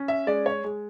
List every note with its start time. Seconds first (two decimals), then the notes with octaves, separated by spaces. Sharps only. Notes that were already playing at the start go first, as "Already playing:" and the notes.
Already playing: C#4
0.08 E5
0.27 G#3 D5
0.46 C#5
0.64 G#3